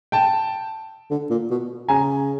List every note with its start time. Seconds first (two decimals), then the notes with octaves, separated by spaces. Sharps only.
0.12 G5 A5
1.11 D3
1.30 A#2
1.50 B2
1.88 C#3 G#5 A#5